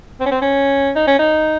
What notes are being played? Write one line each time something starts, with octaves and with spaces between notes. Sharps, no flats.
C4
C#4
C4
C#4
D#4
C#4
D#4